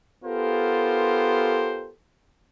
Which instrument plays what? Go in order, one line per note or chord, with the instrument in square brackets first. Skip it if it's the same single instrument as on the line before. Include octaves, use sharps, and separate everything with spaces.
[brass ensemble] B3 F4 G4 A4 A#4 C5